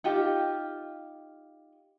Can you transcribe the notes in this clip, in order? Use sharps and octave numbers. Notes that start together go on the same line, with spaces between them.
D#4 F4 G4